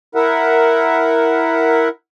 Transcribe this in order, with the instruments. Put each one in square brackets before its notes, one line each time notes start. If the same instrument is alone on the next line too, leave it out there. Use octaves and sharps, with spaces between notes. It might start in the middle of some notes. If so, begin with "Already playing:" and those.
[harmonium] E4 A#4 E5 F#5